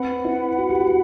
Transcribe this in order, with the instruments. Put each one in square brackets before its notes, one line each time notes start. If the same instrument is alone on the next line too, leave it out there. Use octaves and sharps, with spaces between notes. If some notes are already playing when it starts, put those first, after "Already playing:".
Already playing: [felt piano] C4 [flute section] B4 F#5 B5
[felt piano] E4
F#4
G4
F#4